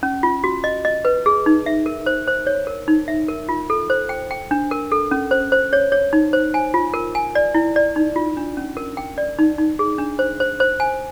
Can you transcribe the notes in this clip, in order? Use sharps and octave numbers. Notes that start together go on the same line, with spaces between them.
C#4
F4
F#4
D#5
D#5
B4
G#4
D#4
E5
A#4
C5
C5
C#5
A#4
D#4
E5
A#4
F4
A4
C5
G5
G5
D4
A#4
A4
C#4
C5
C5
C#5
C#5
D#4
C5
G#5
F4
A#4
G#5
D5
E4
D5
D#4
F4
D4
C#4
A#4
G5
D5
D#4
D#4
G#4
D4
C5
C5
C5
G#5